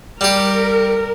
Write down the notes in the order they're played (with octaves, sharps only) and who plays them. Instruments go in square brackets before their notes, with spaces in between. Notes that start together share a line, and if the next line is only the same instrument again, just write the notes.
[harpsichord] G3 G4 [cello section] A#4